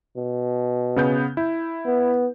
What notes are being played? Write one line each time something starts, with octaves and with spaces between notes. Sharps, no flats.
B2
C#3 B3 G6
E4
B3